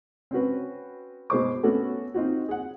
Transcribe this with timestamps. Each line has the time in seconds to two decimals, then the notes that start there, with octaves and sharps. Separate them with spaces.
0.31 C4 C#4 F#4 B4
1.30 B2 G#3 C5 D6
1.63 A3 B3 C#4 F#4 A4
2.14 C4 D#4 F4 F#4
2.48 G#4 F#5